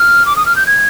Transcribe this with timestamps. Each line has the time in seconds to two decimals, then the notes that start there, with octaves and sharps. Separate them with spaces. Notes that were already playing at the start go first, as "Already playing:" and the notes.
Already playing: F6
0.26 D6
0.36 D#6
0.46 F6
0.56 G6
0.67 G#6